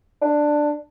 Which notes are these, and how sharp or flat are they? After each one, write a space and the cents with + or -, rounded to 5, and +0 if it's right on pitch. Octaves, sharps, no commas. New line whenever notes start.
D4 +10